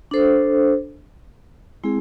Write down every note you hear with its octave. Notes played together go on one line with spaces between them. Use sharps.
D4 A4 C5
G#3 C4 E4 G#4